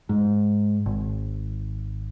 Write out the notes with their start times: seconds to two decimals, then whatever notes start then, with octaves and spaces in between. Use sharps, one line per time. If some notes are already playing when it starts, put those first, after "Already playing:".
0.09 G#2
0.86 G#1